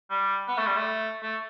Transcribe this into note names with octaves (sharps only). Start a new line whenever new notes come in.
G3
B3
A3
G3
A3
A3